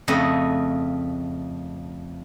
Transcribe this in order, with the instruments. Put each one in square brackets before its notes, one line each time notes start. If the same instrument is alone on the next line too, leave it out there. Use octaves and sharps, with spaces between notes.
[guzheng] F2 C#3 A3 D#5